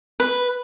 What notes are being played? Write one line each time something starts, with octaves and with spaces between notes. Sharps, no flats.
B4